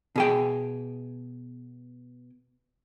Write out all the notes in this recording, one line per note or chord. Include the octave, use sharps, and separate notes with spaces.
B2 G#4 G5